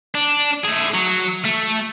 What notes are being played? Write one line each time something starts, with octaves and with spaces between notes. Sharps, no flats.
D4
A3 G#4
F#3
A3